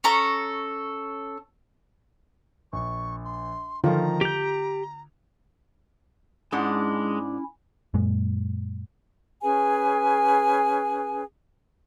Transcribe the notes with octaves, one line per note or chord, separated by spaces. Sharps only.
C#4 A4 A#5 C#6
A#1 C#6
C6
D3 D#3 F3 F4 A#5
G4 G6 F7
G#2 G#3 C#4 D4 E4 F#5
F#2 A#2 G#3
C#4 G#4 B4 G#5